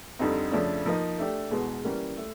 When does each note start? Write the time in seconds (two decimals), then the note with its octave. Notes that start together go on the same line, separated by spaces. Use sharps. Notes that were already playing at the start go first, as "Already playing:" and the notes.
0.19 F2 D3 G3 C4 D#4
0.52 F2 C#3 F3 A3 D4
0.86 F3 A#3 D#4
1.18 A3 D4 G4
1.51 E2 B2 G#3
1.84 E3 G3 A#3 C#4
2.17 A3